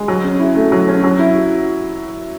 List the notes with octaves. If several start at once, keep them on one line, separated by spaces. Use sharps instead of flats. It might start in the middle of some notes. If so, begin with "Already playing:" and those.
Already playing: G#3
F#3
C#4
E4
A3
F#3
C#4
F#3
E4